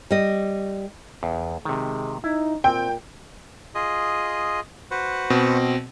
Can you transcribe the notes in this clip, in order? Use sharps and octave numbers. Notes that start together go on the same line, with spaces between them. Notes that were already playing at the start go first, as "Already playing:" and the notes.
G3 D#5
E2
C3 D#3 G#3
D#4 E4
A#2 C4 G5
F4 G#4 D#5
F#4 B4 C5
B2 C4